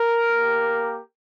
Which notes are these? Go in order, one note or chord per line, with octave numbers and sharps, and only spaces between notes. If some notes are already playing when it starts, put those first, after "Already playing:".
Already playing: A#4
A#3 G4